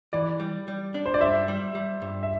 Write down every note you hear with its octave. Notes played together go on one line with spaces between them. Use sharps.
E3 D5
G3
G3
D4
C5
D5
G2 C5 E5
G3
G3
G2
E5